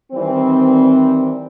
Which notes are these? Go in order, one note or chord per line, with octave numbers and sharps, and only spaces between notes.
D#3 E3 G3 C4